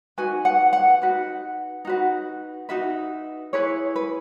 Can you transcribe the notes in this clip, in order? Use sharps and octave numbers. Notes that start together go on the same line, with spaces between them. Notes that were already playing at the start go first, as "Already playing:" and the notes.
D#4 F#4 B4 G#5
F#5
F#5
D#4 F#4 B4
D#4 F#4 B4
D#4 F#4 B4 E5
E4 G#4 B4 C#5
B4